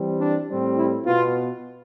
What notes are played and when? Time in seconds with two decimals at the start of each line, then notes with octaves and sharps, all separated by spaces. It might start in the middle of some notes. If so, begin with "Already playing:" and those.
Already playing: E3 G3 C4
0.20 D4
0.48 A2 G3 C4
0.77 E4
1.05 B2 B3 F4